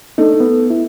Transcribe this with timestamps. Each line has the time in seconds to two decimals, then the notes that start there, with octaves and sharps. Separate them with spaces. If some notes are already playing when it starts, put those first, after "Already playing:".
0.18 A3 D4 D#4
0.40 B3
0.70 E4